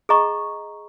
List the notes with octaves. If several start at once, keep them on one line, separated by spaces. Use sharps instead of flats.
G#4 D#5 A#5 C#6